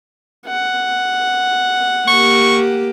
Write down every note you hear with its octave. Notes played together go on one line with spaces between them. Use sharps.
F#5
A#3 G4 C#6